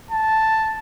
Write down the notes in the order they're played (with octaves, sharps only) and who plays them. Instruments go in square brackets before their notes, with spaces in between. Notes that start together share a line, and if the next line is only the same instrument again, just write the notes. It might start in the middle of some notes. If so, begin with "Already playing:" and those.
[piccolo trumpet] A5